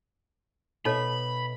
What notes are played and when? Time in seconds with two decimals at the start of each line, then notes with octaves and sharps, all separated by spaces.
0.85 B2 D#4 A4 C#5 E5 B5